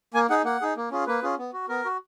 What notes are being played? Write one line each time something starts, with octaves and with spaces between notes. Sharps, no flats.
A#3 G#5
D#4 G#4 F#5
A#3 F#5
D#4 G#4
A#3
C#4 F4 G#4
A#3 B4
C#4 F4 G#4
B3
F#4
B3 A#4
F#4